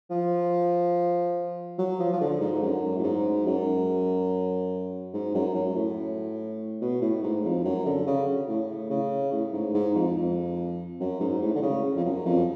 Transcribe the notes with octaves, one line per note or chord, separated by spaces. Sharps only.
F3
F#3
F3
F3
D3
G#2
F#2
A2
G#2
F#2
G#2
F#2
F#2
A2
B2
A2
G#2
F2
F#2
D3
C#3
A2
C#3
A2
G#2
G#2
F2
F2
F#2
G#2
A2
D3
C#3
F2
F#2
F2